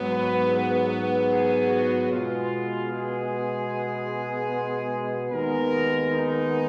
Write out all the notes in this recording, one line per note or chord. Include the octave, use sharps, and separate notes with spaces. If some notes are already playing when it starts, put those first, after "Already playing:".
Already playing: G#2 F#3 B3
B4
G#4
F#4
B2 G#3 B3 F4
G#4
D#2 D#3 G#3 B3 A#4
D#4